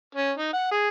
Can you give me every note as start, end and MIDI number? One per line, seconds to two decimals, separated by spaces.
0.15 0.31 61
0.37 0.53 63
0.53 0.70 78
0.71 0.89 68